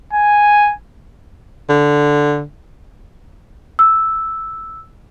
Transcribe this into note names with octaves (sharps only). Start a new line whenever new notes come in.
G#5
D3
E6